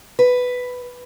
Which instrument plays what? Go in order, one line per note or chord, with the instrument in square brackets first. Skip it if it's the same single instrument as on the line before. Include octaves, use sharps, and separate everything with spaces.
[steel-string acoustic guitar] B4